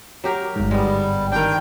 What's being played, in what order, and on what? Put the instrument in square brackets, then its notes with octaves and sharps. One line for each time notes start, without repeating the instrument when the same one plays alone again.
[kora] F#3 G4 A#4
[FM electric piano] G1 G#2
[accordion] G3 [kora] G#3 B3
[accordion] D#3 G5 [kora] D4 A#4